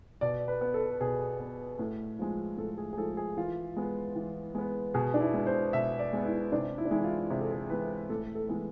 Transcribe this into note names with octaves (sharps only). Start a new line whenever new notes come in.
B2 D5
B4
B3
A4
B2 G#4
B3
A2
F3 G#3
A2 A4
G#4
G#4
F3 G#3 A4
G#4
E3 F4
G#3 B3
E3
G#3 B3
B2 G#4
D4
E4
G#3 B3
C5
B2 E5
D5
G#3 B3
E4
C3 D4
E4
D4
E3 G#3 E4
F4
C3 G#4
A4
G#4
E3 G#3 B4
A2 A4
A4
E3 G#3 B3